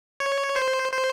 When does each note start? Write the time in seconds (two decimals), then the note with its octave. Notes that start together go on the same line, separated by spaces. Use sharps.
0.20 C#5
0.56 C5
0.92 C5